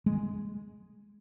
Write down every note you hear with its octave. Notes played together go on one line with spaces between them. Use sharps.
G#3